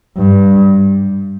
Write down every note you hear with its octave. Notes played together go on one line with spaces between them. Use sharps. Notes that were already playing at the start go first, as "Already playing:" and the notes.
G2